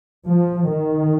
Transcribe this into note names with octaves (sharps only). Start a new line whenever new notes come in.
F3
D#3